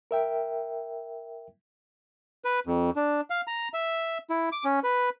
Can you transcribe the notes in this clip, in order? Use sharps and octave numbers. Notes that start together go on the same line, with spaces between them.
A#4 E5 G5
B4
F2
D4
F5
A#5
E5
E4
D6
C#4
B4